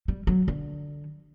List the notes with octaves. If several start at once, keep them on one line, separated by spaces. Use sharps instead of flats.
G3
F#3
D3